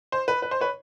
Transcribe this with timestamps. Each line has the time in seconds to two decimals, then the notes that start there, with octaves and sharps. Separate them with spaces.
0.12 C5
0.28 B4
0.42 B4
0.51 C5
0.61 B4 C#5